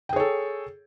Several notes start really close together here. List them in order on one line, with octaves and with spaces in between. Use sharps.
G5 G#4 C#5 A4